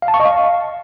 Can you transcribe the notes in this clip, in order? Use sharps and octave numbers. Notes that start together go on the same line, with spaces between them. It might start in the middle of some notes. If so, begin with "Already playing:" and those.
F5
A5
C#6
D#5
F5